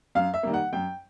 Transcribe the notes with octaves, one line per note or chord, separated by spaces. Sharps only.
F#2 F5
E5
D#3 G3 A#3
F#5
F#2 G5